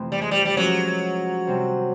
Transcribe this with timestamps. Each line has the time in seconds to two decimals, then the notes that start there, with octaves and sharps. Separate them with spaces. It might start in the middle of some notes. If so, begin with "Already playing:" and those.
Already playing: F2 C3 E3 A3 C4
0.12 G3
0.21 G#3
0.31 G3
0.45 G3
0.57 F3 F#3 G#3 C#4 F#4 A#4
1.47 C3 D#3 G3 C4